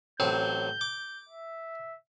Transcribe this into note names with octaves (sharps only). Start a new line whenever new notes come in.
A1 F#3 C4 G6
D6
E5